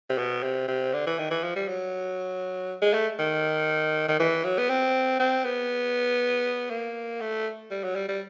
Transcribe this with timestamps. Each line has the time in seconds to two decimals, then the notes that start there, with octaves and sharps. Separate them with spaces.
0.10 C3
0.18 B2
0.43 C3
0.68 C3
0.93 D3
1.07 E3
1.18 D#3
1.31 E3
1.43 F3
1.56 G3
1.68 F#3
2.82 G#3
2.93 A3
3.19 D#3
4.08 D#3
4.19 E3
4.44 F#3
4.58 B3
4.69 C4
5.20 C4
5.45 B3
6.70 A#3
7.21 A3
7.71 G3
7.84 F#3
7.96 G3
8.08 G3